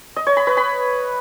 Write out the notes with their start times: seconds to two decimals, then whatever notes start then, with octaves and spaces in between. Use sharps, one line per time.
0.16 D#5
0.27 C#5
0.37 B5
0.47 B4
0.57 B5